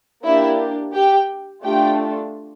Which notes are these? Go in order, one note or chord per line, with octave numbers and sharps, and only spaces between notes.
A#3 D4 E4 G4 E5
G4 G5
A3 D4 F4 G4 A4 G5